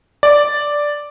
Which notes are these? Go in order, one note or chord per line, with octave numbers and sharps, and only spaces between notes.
D5